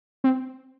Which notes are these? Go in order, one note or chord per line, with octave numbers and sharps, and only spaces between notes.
C4